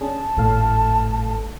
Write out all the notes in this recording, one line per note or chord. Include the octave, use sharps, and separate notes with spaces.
C#4 D4 G#4 A5
G#1 A2 A4 F5